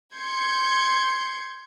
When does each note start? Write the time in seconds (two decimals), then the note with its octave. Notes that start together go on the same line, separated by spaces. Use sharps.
0.14 C6 G6 G#6 C#7